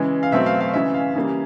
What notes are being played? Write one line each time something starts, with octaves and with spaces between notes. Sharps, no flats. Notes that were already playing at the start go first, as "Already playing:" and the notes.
Already playing: C#3 E3 G#3
F5
B2 F#3 A3 C4 E5
F5
F5
C#3 E3 G#3 E5
F5
C#3 E3 G3 A#3